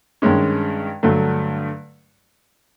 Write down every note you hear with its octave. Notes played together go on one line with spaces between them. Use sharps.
G2 D#3 G#3 C#4
G2 D3 F#3 A3